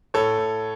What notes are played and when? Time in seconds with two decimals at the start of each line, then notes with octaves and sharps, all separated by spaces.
0.14 A2 A4 C#5
0.37 A2